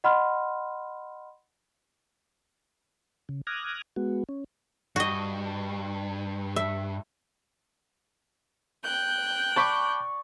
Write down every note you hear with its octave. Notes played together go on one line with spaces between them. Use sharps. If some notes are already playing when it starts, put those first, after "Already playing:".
D#5 F#5 B5 C6 F6
C#3
D6 D#6 F6 F#6 G#6 A#6
G#3 B3 F#4
C#4
G2 F#4 D#5
E5
G5 F#6 G6
D5 A5 B5 C#6 D6